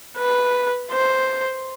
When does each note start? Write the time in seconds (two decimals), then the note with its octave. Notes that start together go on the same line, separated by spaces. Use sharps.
0.18 B4
0.92 C5